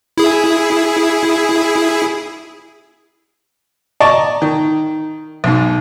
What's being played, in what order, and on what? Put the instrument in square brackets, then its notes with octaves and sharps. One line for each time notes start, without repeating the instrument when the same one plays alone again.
[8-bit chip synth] E4 G#4
[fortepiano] D5 D#5 A5 A#5 C#6
D#3
B1 G#2